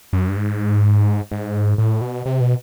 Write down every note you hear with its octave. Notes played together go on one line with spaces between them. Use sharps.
F#2
G2
G#2
G#2
A2
B2
C3
B2